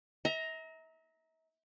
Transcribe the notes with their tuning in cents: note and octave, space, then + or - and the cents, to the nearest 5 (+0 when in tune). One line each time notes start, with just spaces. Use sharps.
E5 -40 A#5 +5